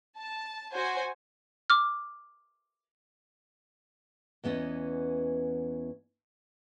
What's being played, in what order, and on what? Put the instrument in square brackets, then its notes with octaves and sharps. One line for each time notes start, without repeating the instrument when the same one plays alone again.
[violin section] A5
F#4 C5 G#5
[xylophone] D6 F6
[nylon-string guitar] E2 E3 B3 C#4 D#5